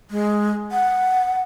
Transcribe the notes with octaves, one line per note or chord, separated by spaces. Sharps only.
G#3
F#5